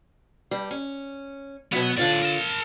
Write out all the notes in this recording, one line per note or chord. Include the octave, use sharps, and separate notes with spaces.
G2 G3
C#4
B2 F#3 B3
A2 D3 F4 C#5 D5
A#4 A5